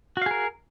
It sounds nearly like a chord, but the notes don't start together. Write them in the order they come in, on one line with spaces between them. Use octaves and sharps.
F#4 F5 G#4 A#4